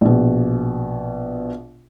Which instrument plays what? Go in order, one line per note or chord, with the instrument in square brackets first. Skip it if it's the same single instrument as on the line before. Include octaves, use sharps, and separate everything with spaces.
[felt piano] A#1 B2